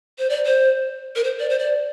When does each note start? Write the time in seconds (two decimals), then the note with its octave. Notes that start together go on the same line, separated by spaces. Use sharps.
0.19 C5
0.30 D5
0.46 C5
1.16 A#4
1.24 C5
1.39 D5
1.50 C5
1.59 D5